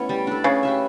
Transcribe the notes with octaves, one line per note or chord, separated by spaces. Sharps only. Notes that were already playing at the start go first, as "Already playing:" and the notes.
Already playing: A3 B3 C#4 E4
G3
D4 A4
C#3 C#4
G4 B4 E5